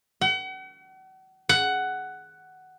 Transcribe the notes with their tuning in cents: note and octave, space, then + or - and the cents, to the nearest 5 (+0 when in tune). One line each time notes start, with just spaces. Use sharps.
F#5 +40
F#5 +10